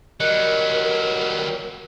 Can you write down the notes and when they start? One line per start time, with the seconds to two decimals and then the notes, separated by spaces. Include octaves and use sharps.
0.20 F#3 G3 A#4 D#5 F#6 C#7